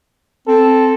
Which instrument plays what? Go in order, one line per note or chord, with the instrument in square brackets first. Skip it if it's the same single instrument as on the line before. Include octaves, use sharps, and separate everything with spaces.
[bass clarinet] C4 [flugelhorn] A4